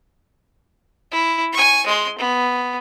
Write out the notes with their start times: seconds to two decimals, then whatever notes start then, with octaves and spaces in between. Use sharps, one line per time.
1.11 E4
1.53 G#5 C#6
1.86 G#3 C6
2.18 B3